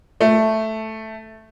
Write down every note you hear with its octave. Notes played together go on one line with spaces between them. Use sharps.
A3